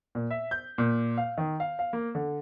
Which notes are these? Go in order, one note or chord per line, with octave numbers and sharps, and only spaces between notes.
A#2
E5
G6
A#2
F5
D#3
F5
F5
A#3
D3